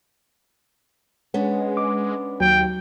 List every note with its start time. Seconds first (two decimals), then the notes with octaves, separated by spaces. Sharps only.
1.34 G#3 B3 C#4 D4
1.77 D6
2.40 D#2 F#3 G5